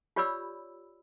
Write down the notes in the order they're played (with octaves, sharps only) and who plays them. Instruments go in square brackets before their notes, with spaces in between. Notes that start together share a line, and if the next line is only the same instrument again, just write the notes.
[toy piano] F4 G4 C#5 D5 B5 E6